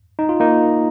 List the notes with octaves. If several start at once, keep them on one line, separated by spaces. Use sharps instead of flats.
D#4
F4
A#3 D#4